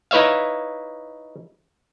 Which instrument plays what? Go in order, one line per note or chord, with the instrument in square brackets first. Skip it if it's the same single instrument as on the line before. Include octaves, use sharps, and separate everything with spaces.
[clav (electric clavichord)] D#4 E4 B4 C#5 E5 F5